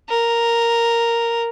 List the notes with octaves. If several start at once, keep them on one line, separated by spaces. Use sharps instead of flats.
A#4